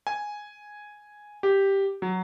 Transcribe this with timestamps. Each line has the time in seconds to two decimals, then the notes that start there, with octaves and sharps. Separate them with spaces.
0.07 G#5
1.43 G4
2.02 F#3